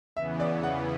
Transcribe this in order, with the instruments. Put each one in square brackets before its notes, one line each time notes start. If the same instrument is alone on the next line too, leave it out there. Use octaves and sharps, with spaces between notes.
[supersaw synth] E2 C#3 E3 B3 [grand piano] E5
[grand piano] D5
F#5